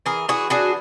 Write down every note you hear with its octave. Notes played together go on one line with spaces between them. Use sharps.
E3 G#4 A#4
E3 F#4 G#4
D4 F#4 G#4